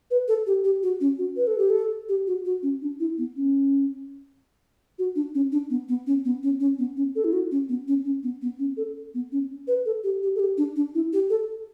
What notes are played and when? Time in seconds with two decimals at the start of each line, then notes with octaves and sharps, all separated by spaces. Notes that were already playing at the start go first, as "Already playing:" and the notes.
0.11 B4
0.28 A4
0.47 G4
0.64 G4
0.83 F#4
1.01 C#4
1.18 F#4
1.37 B4
1.47 A4
1.58 G4
1.70 A4
2.09 G4
2.27 F#4
2.45 F#4
2.63 C#4
2.82 D4
3.00 E4
3.18 B3
3.36 C#4
4.99 F#4
5.16 D4
5.35 C#4
5.52 D4
5.70 B3
5.89 B3
6.07 C#4
6.25 B3
6.43 C#4
6.60 C#4
6.79 B3
6.97 C#4
7.16 A4
7.25 E4
7.33 F#4
7.52 C#4
7.69 B3
7.88 C#4
8.05 C#4
8.23 B3
8.42 B3
8.59 C#4
8.77 A4
9.14 B3
9.32 C#4
9.68 B4
9.86 A4
10.04 G4
10.23 G4
10.36 A4
10.40 G4
10.58 D4
10.76 D4
10.95 E4
11.13 G4
11.30 A4